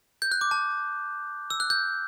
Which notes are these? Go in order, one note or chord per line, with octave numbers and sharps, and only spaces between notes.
G6
F#6
D6
A5
E6
F#6
G6